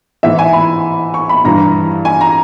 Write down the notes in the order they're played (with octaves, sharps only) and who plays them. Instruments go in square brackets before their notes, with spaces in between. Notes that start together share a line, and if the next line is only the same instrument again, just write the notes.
[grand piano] G#2 E3 E5
G#5
B5
C#6
B5
G2 E3 A#5
G#5
A#5